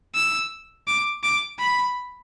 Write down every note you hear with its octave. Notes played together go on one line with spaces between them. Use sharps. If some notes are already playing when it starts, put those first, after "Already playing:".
E6
D6
D6
B5